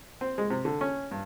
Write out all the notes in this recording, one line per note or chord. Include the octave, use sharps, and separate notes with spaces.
C4
G#3
C3
D3
C#4
G2